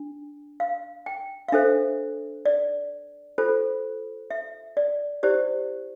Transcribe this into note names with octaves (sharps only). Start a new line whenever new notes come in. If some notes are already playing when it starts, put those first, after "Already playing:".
Already playing: D4
F5
G5
F5
D4 A4 C5 E5
D5
F4 A4 C5
E5
D5
E4 G4 C5 D5